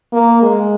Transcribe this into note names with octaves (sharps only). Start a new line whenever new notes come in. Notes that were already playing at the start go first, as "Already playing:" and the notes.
A#3
G#3